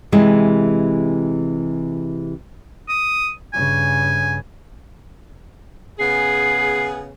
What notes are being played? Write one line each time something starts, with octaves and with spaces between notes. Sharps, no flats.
C3 E3 G#3 E4
D#6
G2 C#3 G#5
C#3 B3 G#4 C7